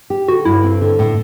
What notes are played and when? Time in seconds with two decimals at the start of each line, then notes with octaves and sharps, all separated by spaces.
0.10 G4
0.28 D3 F#4
0.45 G2 E4
0.64 C4
0.81 D3
0.99 A2